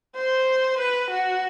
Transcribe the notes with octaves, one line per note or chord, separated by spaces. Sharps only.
C5
B4
F#4